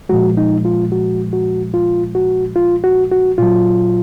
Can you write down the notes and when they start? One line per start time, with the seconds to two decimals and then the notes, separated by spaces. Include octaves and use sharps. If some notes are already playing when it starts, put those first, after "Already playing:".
0.09 A#2 F3 G#3 F#4
0.37 D#4
0.65 F4
0.92 F#4
1.33 F#4
1.74 F4
2.15 F#4
2.56 F4
2.84 F#4
3.12 F#4
3.38 A#2 F#3 F4